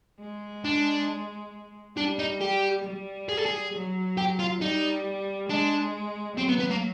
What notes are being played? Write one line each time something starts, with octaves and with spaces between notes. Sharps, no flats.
G#3
D4
G3 D4
D#4
G4
G3
G#4
A4
G#4
F#3
G4
F4
G3 D#4
G#3 D4
F#3 C4
B3
B3
A#3